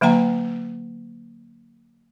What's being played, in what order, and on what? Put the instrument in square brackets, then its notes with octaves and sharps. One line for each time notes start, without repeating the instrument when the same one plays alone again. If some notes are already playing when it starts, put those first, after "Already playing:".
[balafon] D3 F#3 A#3 F#5 A#5